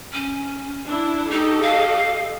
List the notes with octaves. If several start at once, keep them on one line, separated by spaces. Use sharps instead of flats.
C#4
D4 E4
D#4 G4 A4 D#5
F5